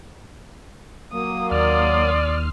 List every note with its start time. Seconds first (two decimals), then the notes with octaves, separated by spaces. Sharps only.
1.12 F#3 A#3 D#6
1.51 D#2 D5 C6 D#6 F6